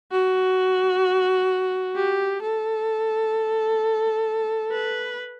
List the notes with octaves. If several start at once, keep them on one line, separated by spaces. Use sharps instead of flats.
F#4
G4
A4
B4